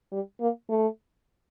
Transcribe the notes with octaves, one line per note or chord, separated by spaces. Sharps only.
G3
A#3
A3